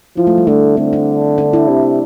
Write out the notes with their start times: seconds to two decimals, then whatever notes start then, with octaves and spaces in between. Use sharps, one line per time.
0.17 F3 E4
0.27 A3
0.38 G3
0.47 D3 A3
0.77 D3 C4
0.93 D4
1.38 D4
1.53 E4
1.68 C3